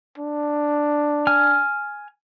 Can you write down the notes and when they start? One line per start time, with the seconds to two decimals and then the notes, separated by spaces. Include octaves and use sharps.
0.18 D4
1.27 G#5 F6